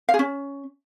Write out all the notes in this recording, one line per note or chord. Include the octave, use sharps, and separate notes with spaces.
F5
G#4
C#4